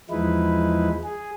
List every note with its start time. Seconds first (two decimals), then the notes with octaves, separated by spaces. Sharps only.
0.10 E2 F3 G#3 D#4 E4 B4
1.03 G#4